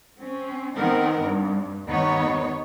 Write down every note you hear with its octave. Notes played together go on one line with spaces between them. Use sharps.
C4 C#4
D#3 B3 C4 D#4 A#4
G2
D#2 B3 D#4 C#5